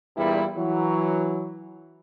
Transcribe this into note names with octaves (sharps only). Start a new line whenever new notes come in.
E2 G2 A#2 G3 E4
E3 F#3